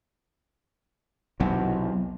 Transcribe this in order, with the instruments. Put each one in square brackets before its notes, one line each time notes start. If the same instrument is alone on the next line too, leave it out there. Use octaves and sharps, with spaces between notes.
[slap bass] B1 E2 C3